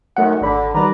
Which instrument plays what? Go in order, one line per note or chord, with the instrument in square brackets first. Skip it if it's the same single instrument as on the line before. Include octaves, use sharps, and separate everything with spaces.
[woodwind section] F#2 D#3 [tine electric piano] A3 F#5
[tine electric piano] G#1 B5 [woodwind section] D3
[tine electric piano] D#3 G3 [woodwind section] B4 D5 A#5